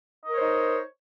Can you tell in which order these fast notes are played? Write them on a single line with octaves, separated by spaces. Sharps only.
D#5 A#4 C#5 C5 D#4